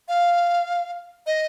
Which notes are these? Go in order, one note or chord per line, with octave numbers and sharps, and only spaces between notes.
F5
D#5